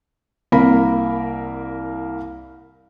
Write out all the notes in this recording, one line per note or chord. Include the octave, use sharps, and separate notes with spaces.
C2 A#3 A#4 B5